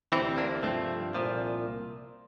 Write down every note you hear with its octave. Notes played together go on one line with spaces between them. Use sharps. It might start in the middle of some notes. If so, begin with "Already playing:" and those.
D2 C3 E3 C4 E4
A#3 D4
G2 F3 A3 C4
C2 A#2 F3